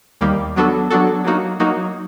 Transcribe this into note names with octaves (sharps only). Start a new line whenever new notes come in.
D#2 D#3 G3 A#3
F#3 B3 D4 F#4 A4
F#3 B3 D4 F#4 A4
F#3 A#3 D#4 F#4
F#3 A#3 D#4 F#4